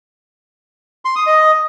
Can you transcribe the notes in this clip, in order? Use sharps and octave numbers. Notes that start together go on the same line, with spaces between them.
C6
D#6
D#5